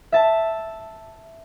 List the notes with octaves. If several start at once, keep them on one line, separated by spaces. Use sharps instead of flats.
E5 A5